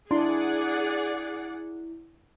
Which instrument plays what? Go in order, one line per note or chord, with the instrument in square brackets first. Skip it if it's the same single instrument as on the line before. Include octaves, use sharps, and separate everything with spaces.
[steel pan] D4 C6 [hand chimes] E4 [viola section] G#4 D5 F#5